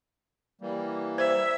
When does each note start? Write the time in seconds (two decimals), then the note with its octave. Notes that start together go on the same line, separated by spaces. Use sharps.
0.61 E3 G3 A#3
1.18 C5 E5